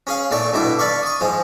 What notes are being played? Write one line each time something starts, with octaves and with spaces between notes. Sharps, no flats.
C#4 G#4 F5
A#2 A3 D#4 D5 C#6
G2 B2 E4 A4 D6
D5 F5 B5 C#6 D6
C#6 D#6
G#2 F3 G#3